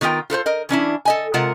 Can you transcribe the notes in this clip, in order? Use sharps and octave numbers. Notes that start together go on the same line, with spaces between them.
D#3 B3 F4 A#4 G5
F4 A4 B4 C5
A#4 D#5
E3 C#4 D4 E4
A4 D#5 G#5
C3 G#3 F4 A#4 F#5